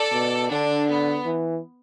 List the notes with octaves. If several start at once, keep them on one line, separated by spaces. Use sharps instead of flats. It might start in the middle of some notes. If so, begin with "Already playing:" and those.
Already playing: A4 D5
B2
D3 D4
B3
E3